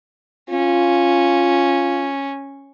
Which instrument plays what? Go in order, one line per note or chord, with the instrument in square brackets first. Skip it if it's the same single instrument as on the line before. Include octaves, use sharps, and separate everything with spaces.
[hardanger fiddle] C#4 [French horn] F4